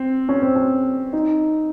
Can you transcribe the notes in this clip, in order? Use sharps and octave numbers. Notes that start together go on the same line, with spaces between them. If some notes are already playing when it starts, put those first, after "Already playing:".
Already playing: C4
C#4
C4
C#4
D#4